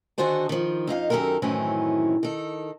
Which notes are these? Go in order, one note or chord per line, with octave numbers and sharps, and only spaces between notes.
D3 D#3 F#4 G#4 C5 A5
D#3 F3
F2 D#4 E4 F5
F#2 D#3 G4 A4 A#4
F#2 A2 D#3 E3 C4 C#4
D#3 A4